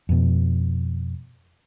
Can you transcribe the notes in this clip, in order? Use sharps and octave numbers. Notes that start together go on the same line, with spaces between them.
F2 B2